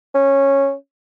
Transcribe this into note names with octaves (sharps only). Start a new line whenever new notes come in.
C#4